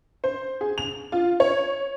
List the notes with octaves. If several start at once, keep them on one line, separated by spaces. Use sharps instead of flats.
C5
G#4
F7
F4
C#5